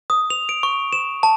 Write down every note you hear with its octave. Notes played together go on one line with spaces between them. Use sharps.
D#6
F7
D7
C#6
E7
A5